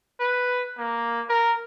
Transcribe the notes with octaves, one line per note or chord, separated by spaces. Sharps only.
B4
A#3
A#4